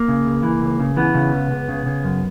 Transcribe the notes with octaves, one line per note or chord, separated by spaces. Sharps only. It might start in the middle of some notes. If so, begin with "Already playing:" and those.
Already playing: A#3
C#3
C#2
E3
C#2
C#3
E3 B3
C#3
C#2
C#2
C#3
C#3
F#2